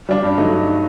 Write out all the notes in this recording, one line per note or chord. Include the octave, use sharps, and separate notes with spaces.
G3 D4
G2
F#3 A3 D#4